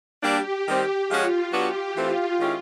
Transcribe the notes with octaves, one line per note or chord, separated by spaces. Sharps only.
G3 A#3 D4 G4
D#3 G3 C4
F3 G#3 C#4 F4 F#4
F#3 B3 D4 F#4 G4
E3 A3 C4 F4
D#3 G#3 C#4 E4 G4